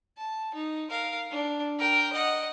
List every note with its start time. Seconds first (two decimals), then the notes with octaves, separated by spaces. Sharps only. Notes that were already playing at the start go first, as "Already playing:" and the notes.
0.18 A5
0.54 D#4
0.90 A#4 F5
1.31 D4
1.79 A#4 G5
2.13 D#5 F#5